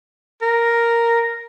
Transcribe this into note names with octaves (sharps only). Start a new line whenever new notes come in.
A#4